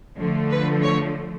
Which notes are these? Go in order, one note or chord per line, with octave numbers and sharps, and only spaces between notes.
D3 F3 A3
B4
C#5